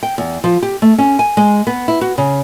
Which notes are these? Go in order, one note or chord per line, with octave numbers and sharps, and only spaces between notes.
G5
E2
F3
G4
A3
C#4
G#5
G#3
B3
E4
F#4
C#3